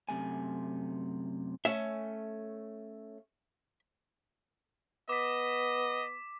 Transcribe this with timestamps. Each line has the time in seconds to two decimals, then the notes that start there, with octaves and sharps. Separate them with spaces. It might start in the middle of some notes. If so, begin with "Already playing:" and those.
0.09 F#2 C3 A3 G#5
1.65 A3 C#4 E5
5.09 B3 D#5 D6 B6